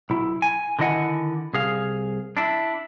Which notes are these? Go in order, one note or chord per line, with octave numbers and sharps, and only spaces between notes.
B1 E4
G#5
D3 D#3 E4 D#5 F#5 G#5
C2 G#4 F5
D4 E4